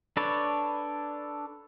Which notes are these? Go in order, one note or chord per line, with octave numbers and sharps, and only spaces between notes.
D4 A4 B4 C#5 D5